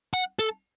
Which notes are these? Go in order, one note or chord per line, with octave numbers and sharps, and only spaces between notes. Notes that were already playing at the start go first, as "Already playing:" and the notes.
F#5
A4